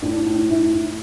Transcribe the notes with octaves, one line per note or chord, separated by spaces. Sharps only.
A2 D4
A2
A2 E4
A2